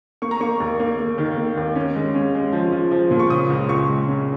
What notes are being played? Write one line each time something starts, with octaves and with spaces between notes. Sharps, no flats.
A#3 C#6
A#5
A#3 C#6
D#2
A#3
A#3
D#3
A#3
D#2
C#4
G#3
C#4
G#3
F3
F3
F3
A#2
C#6
C#3 D#6
C#2
C#2 C#6
G#3
C#4